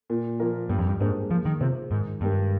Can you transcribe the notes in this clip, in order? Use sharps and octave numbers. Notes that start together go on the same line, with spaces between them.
A#2
F3 A#3 F4 A#4
G2 G3
F2
G2
G#2 A#3 D4 G#4 C5
F3 A#3
D#3
C3 F4 G#4 C5
G#2 D#3
G2 G#3 D4 G4 A#4